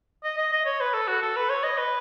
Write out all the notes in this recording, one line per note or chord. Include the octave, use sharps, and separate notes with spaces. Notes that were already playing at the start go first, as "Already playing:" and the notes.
D#5
D#5
D#5
C#5
B4
A4
F#4
A4
B4
C#5
D#5
B4